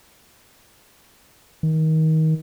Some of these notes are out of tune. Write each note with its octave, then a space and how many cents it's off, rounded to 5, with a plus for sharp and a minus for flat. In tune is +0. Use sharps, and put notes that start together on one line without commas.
D#3 +25